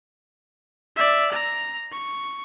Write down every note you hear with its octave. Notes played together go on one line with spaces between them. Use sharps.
D5 E5
A#5
C#6